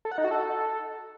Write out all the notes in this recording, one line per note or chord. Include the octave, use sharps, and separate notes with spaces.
A4
F#5
D#4
F#4
A4